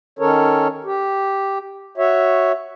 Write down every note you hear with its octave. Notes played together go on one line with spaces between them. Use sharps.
D#3 C#4 A4 A#4 C#5
G4
F#4 C#5 E5